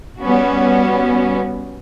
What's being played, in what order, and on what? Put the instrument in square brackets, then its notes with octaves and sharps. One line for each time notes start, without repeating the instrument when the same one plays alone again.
[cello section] G3 B3 C#4 F#4